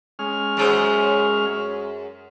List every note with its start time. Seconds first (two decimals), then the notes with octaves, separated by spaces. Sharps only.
0.19 G#3 C#4 F6
0.57 F#2 G#4 C5